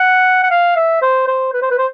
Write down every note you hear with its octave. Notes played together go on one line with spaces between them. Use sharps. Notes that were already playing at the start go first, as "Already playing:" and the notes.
Already playing: F#5
F#5
F5
E5
C5
C5
B4
C5
B4
C5